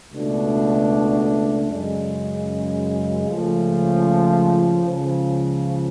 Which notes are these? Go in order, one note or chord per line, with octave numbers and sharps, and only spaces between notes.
C#2 B2 A3 D4
F#2 C#3 G#3
C#2 C#3 F3 A3
C#2 C#3 F3